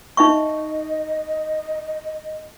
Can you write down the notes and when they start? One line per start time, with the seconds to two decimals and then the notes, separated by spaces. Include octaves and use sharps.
0.17 D#4 D#5 E5 C#6